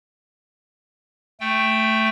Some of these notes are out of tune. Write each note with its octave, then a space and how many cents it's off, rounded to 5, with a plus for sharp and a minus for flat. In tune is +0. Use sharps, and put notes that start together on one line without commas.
A3 +5 G5 +0